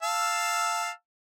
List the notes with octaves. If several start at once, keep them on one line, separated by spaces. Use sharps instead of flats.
F5 A5 E6